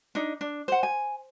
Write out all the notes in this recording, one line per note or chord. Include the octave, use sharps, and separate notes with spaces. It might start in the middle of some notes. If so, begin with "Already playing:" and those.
D4 D#4
D4
C5 F#5
G#5